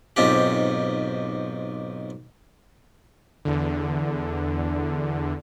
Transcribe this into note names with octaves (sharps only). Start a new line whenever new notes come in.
B1 G#2 C4 F4 G4
E2 D3